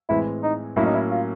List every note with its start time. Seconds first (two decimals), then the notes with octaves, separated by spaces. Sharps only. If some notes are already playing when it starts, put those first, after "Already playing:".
0.09 A2 E3 G#3 C4 E4
0.43 D#4
0.76 A2 F#3 A#3 C#4 E4
0.86 D#4
0.95 E4
1.11 F4